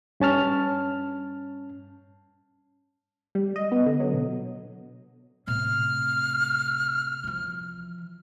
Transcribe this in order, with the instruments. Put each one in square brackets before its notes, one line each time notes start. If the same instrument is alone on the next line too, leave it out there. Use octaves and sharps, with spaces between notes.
[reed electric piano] G2 C#4 A5 F6
[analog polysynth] G3
D#5
B3
D3
F#3
B2
[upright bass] A2 C3 [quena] F6
[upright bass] E3 F3